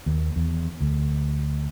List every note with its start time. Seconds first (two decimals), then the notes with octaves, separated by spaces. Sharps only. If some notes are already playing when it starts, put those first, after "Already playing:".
0.06 D#2
0.36 E2
0.81 D2